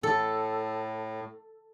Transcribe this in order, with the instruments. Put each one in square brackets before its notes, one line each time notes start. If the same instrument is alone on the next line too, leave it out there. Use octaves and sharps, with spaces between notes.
[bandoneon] A2 [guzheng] A4